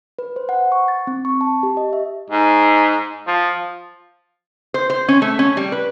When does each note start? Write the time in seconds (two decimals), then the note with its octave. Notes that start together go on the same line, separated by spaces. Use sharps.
0.19 B4
0.36 C5
0.49 F#5
0.72 C#6
0.88 A6
1.07 C4
1.25 C#6
1.41 A5
1.63 G4
1.77 D#5
1.93 E5
2.30 G#2
3.27 F3
4.74 C5
4.90 C5
5.08 C#4
5.22 A3
5.39 C#4
5.57 G3
5.72 B4